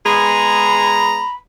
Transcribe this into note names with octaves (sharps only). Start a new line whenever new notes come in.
G#3 B3 G#4 A#5 B5